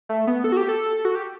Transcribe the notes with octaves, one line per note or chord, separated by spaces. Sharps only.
A3
B3
A4
F#4
G4
A4
F#4
G4